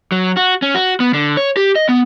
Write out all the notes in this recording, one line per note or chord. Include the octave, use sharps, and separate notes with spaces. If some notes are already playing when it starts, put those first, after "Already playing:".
F#3
F#4
C#4
F#4
B3
D3
C#5
G4
D#5
B3